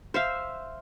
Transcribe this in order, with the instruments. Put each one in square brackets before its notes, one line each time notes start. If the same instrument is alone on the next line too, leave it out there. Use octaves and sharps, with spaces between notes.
[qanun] C5 E5 F5